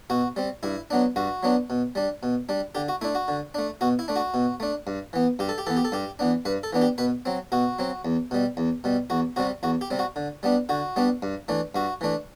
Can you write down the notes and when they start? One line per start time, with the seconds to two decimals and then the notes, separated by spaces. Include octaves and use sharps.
0.10 B2 F#4
0.36 G3 C4
0.63 G2 E4
0.90 F#3 B3 D4
1.16 G2 F#4
1.43 F#3 B3 D4
1.70 B2
1.95 G3 D4
2.23 B2
2.49 G3 D4
2.75 D3 G4
2.88 F#4
3.01 A3 D4 E4
3.15 F#4
3.28 D3
3.54 A3 D4
3.81 B2 F#4
3.99 E4
4.08 A3 D4
4.16 F#4
4.34 B2
4.60 A3 D4
4.87 G2
5.13 E3 B3
5.39 G2 G4
5.49 A4
5.58 G4
5.66 E3 B3 A4
5.77 G4
5.84 A4
5.92 G2 G4
6.19 E3 B3 D4
6.45 G2 B4
6.63 A4
6.73 E3 B3 D4
6.82 G4
6.98 B2 B4
7.25 F#3 C4
7.52 B2 F#4
7.79 F#3 C4
8.05 E2
8.31 B2 G3
8.57 E2
8.84 B2 G3
9.10 E2 F#4
9.36 C3 G3 C4 F#4
9.63 E2 F#4
9.81 G4
9.90 C3 G3 C4
9.99 F#4
10.16 D3
10.43 G3 B3 D4
10.69 D3 F#4
10.96 G3 B3 D4
11.23 G2
11.48 E3 A3 D4
11.75 G2 F#4
12.01 E3 A3 D4